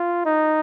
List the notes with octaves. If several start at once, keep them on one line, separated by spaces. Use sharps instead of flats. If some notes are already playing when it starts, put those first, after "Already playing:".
Already playing: F4
D#4